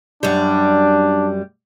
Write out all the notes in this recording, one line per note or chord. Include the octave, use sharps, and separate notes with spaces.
F#2 G3 D4